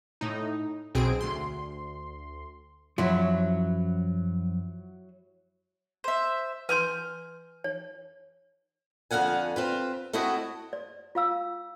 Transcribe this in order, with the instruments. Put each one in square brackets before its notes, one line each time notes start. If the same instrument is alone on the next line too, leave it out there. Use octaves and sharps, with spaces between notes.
[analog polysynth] A2 D#4
B1 B2 C4 G#4 D7
D2 C6
[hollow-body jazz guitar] F#2 F3 [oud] F#3 E4
[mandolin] C5 E5
[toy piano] B4 C6 [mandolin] G#5 F6 G6
[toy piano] C#5
[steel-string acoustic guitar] F2 D3 F5 F#5 G#5
C4 F4 B4
A3 C4 E4 F#4 D#5
[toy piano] D5
F4 F5 E6